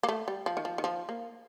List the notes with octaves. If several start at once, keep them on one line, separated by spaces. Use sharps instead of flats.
A#3
A3
G3
F3
D#3
F3
D#3
F3
A#3